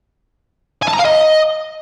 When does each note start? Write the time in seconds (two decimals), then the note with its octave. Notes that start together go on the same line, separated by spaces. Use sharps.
0.83 G#5
0.88 A5
0.94 A#5
0.99 F5
1.05 D#5